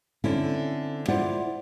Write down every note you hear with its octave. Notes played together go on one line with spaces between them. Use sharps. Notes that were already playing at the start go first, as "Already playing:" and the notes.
D3 C4 C#4 E4
E4 F4 C5 D5 E5 F#5